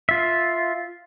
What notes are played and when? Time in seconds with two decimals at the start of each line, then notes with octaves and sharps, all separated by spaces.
0.09 F4 E5